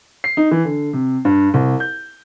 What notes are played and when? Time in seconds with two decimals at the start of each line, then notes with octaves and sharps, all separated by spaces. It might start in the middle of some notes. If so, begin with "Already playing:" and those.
0.24 C7
0.37 D#4
0.51 E3
0.65 D3
0.93 C3
1.25 G2
1.54 C2
1.80 G6